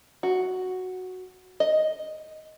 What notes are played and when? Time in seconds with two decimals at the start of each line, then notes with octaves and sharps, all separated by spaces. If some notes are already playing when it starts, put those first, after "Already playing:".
0.23 F#4
1.60 D#5